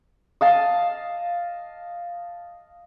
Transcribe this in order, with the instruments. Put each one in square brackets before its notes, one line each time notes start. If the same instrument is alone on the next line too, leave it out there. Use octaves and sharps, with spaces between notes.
[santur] D#5 F5 A5